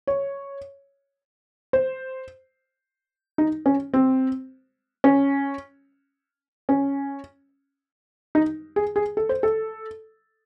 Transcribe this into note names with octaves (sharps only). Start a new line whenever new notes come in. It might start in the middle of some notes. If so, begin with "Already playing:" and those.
C#5
C5
D#4
C#4
C4
C#4
C#4
D#4
G#4
G#4
A4
C5
A4